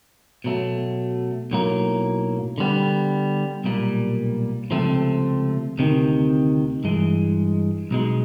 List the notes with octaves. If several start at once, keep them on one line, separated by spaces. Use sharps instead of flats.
B2 F#3 A3
B1 A2 F#3 A#3
D3 G3 B3
B1 A#2 G3 A#3
C#2 C3 F3 A3 C4
D2 C3 D#3
G2 E3 G#3
B1 B2 G#3